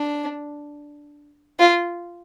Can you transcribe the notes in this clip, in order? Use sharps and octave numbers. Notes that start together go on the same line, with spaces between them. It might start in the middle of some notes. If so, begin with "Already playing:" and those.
Already playing: D4
F4